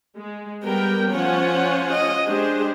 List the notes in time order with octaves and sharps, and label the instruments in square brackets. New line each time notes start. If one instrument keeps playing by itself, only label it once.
[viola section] G#3
[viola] G3 B3 [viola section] A#4 G5
[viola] F3 C#4 [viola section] F4 C#5 F#5
[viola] D#5
[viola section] G#3 G#4 C5 [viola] D4 G4